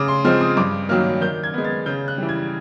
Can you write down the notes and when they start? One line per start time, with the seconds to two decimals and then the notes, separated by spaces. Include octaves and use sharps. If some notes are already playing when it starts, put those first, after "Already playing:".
Already playing: C#3 D6
0.08 C6
0.25 F3 G#3 C4 F6
0.41 D#6
0.57 G2 D6
0.89 D#3 F#3 A#3 F6
1.21 D#3 G6
1.44 G#6
1.54 G#3 B3
1.64 A6
1.86 C#3 G6
2.08 F#6
2.18 E3 G3
2.29 G#6